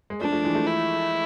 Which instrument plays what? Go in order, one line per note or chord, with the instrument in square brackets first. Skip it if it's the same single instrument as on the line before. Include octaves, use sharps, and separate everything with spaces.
[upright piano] G#3
[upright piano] F3 A3 [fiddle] D4
[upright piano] F3 A3
E3 G#3
F3 A3
[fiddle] E4